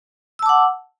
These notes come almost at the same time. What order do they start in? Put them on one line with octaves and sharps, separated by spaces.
E6 A5 D6 F#5